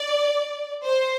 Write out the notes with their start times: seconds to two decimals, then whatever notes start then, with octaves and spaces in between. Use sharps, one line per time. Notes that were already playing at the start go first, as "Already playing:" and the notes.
Already playing: D5
0.85 C5